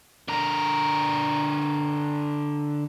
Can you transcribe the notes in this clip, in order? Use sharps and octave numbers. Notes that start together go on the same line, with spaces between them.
D3 A#4